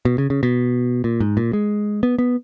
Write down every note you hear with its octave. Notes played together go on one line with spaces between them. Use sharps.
B2
C#3
C#3
B2
A#2
G#2
A#2
G#3
B3
B3